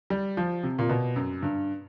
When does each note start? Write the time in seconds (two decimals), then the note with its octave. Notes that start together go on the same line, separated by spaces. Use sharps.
0.10 G3
0.37 F3
0.63 C3
0.79 A#2
0.89 B2
1.16 F#2
1.42 G2